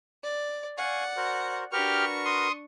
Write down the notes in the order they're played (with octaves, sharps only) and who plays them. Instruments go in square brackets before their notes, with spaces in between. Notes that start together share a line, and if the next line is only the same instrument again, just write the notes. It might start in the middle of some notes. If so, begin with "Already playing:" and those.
[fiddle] D5
[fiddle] D5 F#5 [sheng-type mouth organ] F5 G#5 C#6
[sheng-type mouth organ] F#4 A#4 C5
[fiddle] D4 C#6 [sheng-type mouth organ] F#4 A#4 B4 [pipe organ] G4 F6
[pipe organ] C6 D#6